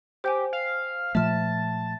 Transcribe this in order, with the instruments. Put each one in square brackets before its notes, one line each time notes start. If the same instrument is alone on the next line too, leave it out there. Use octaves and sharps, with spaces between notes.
[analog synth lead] G4 [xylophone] C5 G5 G#5
[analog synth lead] F5
[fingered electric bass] A#2 F3 A3 [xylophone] E5 F6 [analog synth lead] A5